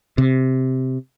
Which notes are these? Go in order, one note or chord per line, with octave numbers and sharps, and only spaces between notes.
C3